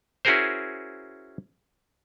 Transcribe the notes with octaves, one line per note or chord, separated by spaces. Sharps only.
C#4 E4 F#4 G#4 A#4 C5